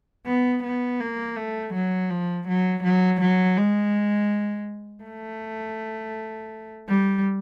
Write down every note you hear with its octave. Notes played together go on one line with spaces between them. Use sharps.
B3
B3
A#3
A3
F#3
F3
F#3
F#3
F#3
G#3
A3
G3